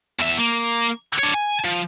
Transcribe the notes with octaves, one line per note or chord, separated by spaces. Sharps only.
E2 E5
A#3
D4 C#5
G#5
F3